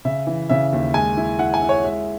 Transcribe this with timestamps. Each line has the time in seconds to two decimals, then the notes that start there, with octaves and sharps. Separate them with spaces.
0.05 C#3 E5
0.27 E3
0.50 C#3 E5
0.73 D#2
0.94 G#3 G#5
1.17 E4
1.39 E4 F#5
1.54 G#5
1.62 E4
1.69 C#5
1.84 G#3 E5